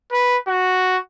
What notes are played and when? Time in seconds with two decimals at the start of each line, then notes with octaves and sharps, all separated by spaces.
0.12 B4
0.48 F#4